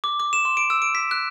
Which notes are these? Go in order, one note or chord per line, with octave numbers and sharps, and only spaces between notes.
D6
D6
E7
C6
D7
E6
D7
B6
F#6